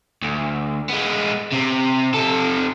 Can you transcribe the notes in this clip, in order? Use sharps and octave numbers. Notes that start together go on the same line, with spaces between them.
D2
G#3 B3
C3 C4
C3 A4